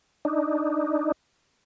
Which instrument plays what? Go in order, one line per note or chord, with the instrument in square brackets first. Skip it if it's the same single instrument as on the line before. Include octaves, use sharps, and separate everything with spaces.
[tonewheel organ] D4 D#4